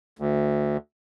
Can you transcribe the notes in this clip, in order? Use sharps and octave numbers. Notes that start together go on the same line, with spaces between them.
D2